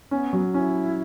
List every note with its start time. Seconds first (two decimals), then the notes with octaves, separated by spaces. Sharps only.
0.11 B3 C#4
0.33 F#3
0.54 C#4 E4